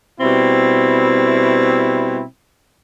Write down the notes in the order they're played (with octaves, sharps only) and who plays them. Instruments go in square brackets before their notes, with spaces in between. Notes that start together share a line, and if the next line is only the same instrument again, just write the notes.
[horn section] B2 G3 C4 E4